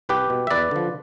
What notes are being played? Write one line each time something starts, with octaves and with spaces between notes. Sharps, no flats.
C2 G4 B4
B2
E5
E2 B4 D5
D3 F3